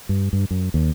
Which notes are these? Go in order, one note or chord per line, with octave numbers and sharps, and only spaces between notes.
G2
G2
F#2
D#2